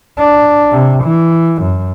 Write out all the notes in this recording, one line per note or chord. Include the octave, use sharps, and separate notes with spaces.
D4
C3
E3
F#2